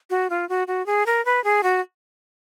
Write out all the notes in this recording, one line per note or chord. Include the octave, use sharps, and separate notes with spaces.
F#4
F4
F#4
F#4
G#4
A#4
B4
G#4
F#4